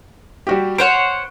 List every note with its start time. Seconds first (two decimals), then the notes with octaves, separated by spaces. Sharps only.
0.47 G3 F#4 G4
0.78 C5 C#5 F#5 D7